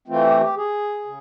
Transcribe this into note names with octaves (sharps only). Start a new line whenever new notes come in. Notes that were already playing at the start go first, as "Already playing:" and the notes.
E3 A3 C4 F4
G4
G4
G#4
C#3